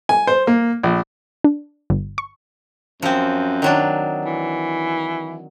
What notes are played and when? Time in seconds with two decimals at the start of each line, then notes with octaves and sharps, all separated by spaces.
0.09 G#5
0.27 C5
0.47 A#3
0.83 A#1
1.44 D4
1.90 G1
2.18 C#6
3.02 F#2 F3 C4
3.62 D#3 F#3 D4
4.25 E3